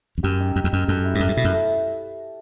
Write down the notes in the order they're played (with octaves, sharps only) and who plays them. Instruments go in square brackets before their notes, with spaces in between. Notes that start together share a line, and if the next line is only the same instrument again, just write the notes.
[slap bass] E2
[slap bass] F#2 [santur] G4
[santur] D#4
[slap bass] F#2 [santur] G4
[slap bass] E2
[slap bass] F#2 [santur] D#4
[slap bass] F#2 [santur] A4
[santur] E4
[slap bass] G2
[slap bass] F#2 [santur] A4
[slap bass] G2
[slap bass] B2 [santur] E4
[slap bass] F#2
[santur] A3